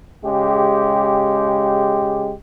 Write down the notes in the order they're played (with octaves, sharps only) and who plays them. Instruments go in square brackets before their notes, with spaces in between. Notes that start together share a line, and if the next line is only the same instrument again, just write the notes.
[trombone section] C#3 G#3 G4